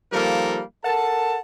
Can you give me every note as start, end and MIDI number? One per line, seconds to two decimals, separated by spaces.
0.13 0.61 51
0.13 0.61 53
0.13 0.61 55
0.13 0.61 58
0.13 0.61 69
0.13 0.61 70
0.84 1.38 69
0.84 1.38 70
0.84 1.38 78
0.84 1.38 81